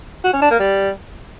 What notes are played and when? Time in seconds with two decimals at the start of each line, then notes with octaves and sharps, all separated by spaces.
0.24 F#4
0.33 C#4
0.42 D4
0.51 A#3
0.60 G3